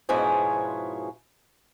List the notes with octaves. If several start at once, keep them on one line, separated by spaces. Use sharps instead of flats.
G#2 B2 F3 C#4 E4 G#4